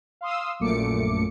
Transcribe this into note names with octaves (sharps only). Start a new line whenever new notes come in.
F5 C6 D#6 E6
A#1 F#2 A#2 A3 D6 C#7